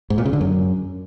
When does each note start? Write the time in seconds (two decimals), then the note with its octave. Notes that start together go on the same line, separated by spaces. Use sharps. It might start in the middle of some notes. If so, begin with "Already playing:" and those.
0.10 G#2
0.18 A#2
0.26 C#3
0.33 D3
0.41 F#2